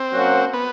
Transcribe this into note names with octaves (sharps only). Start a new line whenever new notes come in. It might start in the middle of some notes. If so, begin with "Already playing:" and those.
Already playing: C4
F#3 A#3 C#4 F#4
B3